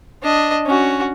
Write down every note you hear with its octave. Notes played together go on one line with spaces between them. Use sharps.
D4 D#5
C#4 F#4